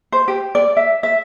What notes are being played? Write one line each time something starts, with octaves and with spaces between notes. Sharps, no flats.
C5
G4
D5
E5
E5